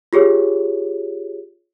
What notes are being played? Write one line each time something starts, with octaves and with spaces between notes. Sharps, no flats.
F4 G4 G#4 C#5